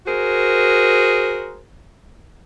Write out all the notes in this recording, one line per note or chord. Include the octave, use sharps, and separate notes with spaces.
F#4 G#4 A#4 C5